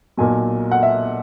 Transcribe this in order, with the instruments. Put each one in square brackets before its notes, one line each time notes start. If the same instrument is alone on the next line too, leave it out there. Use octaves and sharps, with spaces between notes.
[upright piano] B1 A#2 F#3 G#5
F#5
E5